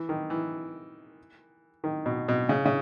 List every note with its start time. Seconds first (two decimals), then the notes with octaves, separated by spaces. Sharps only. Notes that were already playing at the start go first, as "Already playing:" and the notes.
Already playing: E3
0.09 D#3
0.30 E3
1.84 D#3
2.06 B2
2.28 B2
2.49 C#3
2.65 C#3